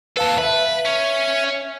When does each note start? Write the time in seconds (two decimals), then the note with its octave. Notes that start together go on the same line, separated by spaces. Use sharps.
0.17 D#2 A4 B4 F5 A5
0.38 B4 E5
0.85 C#4